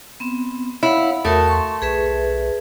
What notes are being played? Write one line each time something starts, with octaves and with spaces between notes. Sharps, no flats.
B3 C4
E4 C#5 F5 F#5
E2 A3 F#4 A#4 D#6
C6 C#6
B1 G#4 B4 E5